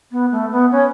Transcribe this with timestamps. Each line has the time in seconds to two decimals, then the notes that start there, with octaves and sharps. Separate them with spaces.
0.11 B3
0.31 A3
0.51 B3
0.71 C#4